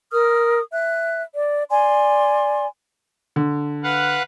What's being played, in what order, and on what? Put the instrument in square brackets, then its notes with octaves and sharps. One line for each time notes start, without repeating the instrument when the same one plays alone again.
[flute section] A#4 D#6 F6
E5 F#6
D5
D5 G#5 C6
[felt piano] D3
[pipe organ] B4 F5 F#5